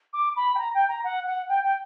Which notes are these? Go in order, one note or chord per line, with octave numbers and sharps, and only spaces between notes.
D6
B5
G5
A#5
G5
A#5
F#5
F#5
G5
G5